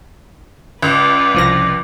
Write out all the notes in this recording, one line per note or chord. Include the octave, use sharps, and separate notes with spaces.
C#2 B4 D5
C2 F3 A#6